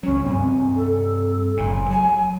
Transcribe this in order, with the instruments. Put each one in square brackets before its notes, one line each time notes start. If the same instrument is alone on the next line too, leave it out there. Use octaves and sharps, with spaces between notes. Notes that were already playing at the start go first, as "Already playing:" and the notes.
[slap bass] C#2 F#3 [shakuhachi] C#4
[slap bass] G2 C3 C4 [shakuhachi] G#5
[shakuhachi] A4
[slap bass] F#1 A2 [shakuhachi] G#5
[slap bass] F#3 [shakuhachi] G#5